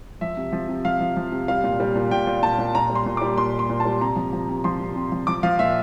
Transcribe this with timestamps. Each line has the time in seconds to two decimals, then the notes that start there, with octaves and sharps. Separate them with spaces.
0.21 F3 E5
0.37 C3
0.52 F3
0.69 C3
0.85 F3 F5
1.00 F3
1.16 F3
1.32 C3
1.48 G3 F5
1.64 A#2
1.80 G3
1.96 A#2
2.11 A#2 G5
2.27 A#2
2.43 A#2 A5
2.59 A#2
2.75 A#2 A#5
2.90 G3
2.95 C6
3.06 A#2
3.17 D6
3.22 G3
3.38 A#2 C6
3.54 G3
3.59 C6
3.70 A#2
3.80 A5
3.85 G3
4.01 C3 A#5
4.16 F3
4.33 F3
4.49 C3
4.64 F3 C6
4.80 C3
4.96 C3
5.12 F3
5.27 F3 D6
5.43 F3 F5
5.59 A#2 E5